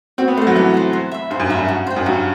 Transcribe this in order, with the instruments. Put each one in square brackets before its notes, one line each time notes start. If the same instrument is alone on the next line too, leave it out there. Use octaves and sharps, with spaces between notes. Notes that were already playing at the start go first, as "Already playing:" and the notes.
[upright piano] C4 [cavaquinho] F#4
[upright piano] B3
[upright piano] A3 [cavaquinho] C5 F#5
[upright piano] F#3
[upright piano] E3 [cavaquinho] F#4
[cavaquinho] C5 F#5
C5
E5 B5
[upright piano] G2 [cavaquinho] C5
[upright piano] F#2
[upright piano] G2 [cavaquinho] E5 B5
[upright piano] F#2
[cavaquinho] F#4
C5 G5
[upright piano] F#2
[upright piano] G2 [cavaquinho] F#4